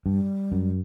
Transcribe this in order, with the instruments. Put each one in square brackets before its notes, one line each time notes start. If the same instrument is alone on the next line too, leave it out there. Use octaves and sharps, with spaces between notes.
[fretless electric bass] G2 [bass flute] G3
[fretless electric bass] F#2